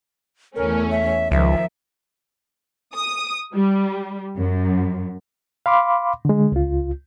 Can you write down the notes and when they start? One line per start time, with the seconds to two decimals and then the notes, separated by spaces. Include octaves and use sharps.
0.56 E2 A3 C#4 A#4
0.91 E5
1.32 C#2 D#3 F3 E5
2.94 D#6
3.53 G3
4.37 F#2
5.66 F5 B5 C6 D6
6.25 D3 G#3
6.52 C#2 F4